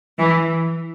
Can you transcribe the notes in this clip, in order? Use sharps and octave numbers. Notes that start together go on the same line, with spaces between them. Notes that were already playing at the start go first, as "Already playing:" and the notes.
E3